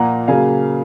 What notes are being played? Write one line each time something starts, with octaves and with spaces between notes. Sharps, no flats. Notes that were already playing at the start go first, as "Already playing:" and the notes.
Already playing: A#2 F3 A#3 F#5 A#5
C#3 F#3 A#3 F5 G#5